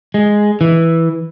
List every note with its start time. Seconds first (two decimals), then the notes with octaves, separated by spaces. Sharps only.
0.14 G#3
0.61 E3